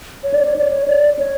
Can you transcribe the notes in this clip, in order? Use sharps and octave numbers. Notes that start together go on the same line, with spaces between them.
C#5
D5
C#5
D5
C#5
D5
C#5